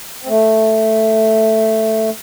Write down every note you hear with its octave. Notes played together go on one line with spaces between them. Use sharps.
C4
A3